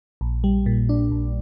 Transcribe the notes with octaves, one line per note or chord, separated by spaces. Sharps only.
A#1
G3
A#2
D4
A#1